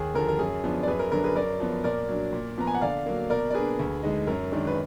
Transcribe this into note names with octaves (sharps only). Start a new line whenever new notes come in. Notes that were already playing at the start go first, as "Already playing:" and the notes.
Already playing: D#2 G#4
D3 F3 A#4
A#4
F#2 G#4
F3 B3 D4
D5
F#2 G#4 B4
A#4
D3 F#3 D4 A#4
G#4 B4
F#2 A#4 D5
F3 B3
A#2 A#4 D5
F#3 D4
A#2
F3 B3 A#5
G#5
F#5
D3 D5 F5
F#3 A#3
B2 A#4 D5
D5
A#3 D4 G#4 B4
D2
D3 G#3 D#4
F#2 A#4
D#3 G#3 D4
B4